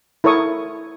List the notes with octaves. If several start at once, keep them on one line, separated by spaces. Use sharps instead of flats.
E4 A4 A#4 C#5 C#6 D#6